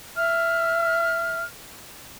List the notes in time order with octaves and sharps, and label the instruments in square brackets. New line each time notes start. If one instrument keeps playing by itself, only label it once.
[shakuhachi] E5 [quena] F6